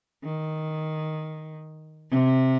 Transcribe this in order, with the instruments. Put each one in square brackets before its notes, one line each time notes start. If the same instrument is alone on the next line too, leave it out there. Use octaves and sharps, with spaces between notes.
[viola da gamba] D#3
C3